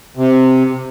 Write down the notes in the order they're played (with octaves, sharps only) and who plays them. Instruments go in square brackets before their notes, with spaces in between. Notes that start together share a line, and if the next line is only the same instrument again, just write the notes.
[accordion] C3